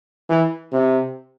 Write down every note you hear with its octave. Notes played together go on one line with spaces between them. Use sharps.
E3
C3